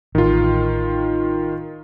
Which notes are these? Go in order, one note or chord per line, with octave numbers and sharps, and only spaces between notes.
A1 D#3 F4